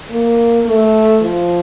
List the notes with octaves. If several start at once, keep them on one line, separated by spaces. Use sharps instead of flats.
A#3
A3
F3